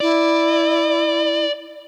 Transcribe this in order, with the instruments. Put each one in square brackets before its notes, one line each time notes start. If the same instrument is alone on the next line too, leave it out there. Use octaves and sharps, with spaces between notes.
[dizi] E4 [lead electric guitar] D5